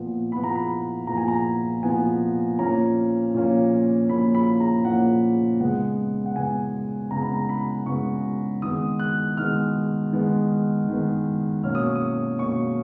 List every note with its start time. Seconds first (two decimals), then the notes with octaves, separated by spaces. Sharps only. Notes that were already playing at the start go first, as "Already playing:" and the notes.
Already playing: A#2 F3 B3
0.32 A#2 F3 B3 B5
0.44 A#5
0.55 B5
1.07 A#2 F3 B3 A#5
1.17 G#5
1.28 A#5
1.83 A#2 F3 B3 G#5
2.59 A#2 F3 A#3 C#4 A#5
3.34 A#2 F3 A#3 C#4
4.09 A#2 F3 A#3 C#4 B5
4.35 B5
4.60 A#5
4.85 A#2 F3 A#3 C#4 F#5
5.60 C#3 G#3 B3 F#5
6.26 F#5
6.36 C#3 G#3 B3 G#5
7.11 C#3 G#3 B3 A#5
7.22 B5
7.34 A#5
7.49 B5
7.86 C#3 G#3 B3 C#6
8.62 D#3 G#3 B3 D#6
8.99 F#6
9.37 D#3 G#3 B3 F6
10.13 D#3 G#3 B3
10.88 D#3 G#3 B3
11.63 B2 A#3 C#4 F6
11.75 D#6
11.85 C#6
11.96 D#6
12.39 B2 A#3 C#4 C#6